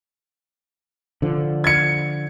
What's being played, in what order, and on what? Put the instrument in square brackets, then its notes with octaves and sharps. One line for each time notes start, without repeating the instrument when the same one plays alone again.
[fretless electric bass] D3 F3
[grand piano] G#6 C#7